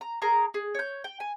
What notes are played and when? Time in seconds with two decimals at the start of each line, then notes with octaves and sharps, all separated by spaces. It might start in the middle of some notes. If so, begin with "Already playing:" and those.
0.01 A#5
0.22 G#4 A#4 A#5
0.54 G#4
0.75 C#5 G6
1.04 G5
1.20 G#5